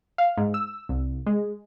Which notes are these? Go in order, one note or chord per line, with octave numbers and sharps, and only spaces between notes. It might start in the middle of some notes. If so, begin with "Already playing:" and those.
F5
G#2
E6
C2
G#3